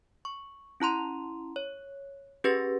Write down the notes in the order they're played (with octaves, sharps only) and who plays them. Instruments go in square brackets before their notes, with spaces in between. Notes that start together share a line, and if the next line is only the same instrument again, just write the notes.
[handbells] C#6
C#4 E4 A#5 C6
C#5
C#4 G4 G#4 B4 A6 A#6